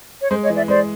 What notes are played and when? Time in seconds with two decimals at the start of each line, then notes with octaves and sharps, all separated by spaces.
0.20 C#5
0.31 G#3 C5
0.43 C#5 D#5
0.50 E3
0.56 D5 E5
0.68 G#3 C5 D5